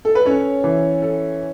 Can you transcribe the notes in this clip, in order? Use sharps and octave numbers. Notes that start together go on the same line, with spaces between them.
A4
B4
C#4 A4 C#5
E3
A4